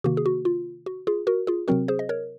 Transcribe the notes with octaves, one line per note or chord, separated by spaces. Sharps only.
C3 D#3 A#3 F#4
G#4
F#4
F4
F#4
F4 G#4
F#4 A#4
F4 G#4
C3 F#3 C4 F#4 A#4
G#4 C5
D#5
A#4 C#5